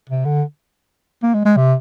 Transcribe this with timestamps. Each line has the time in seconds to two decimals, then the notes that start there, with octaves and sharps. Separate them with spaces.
0.09 C3
0.25 D3
1.23 A#3
1.34 G#3
1.45 G#3
1.57 C3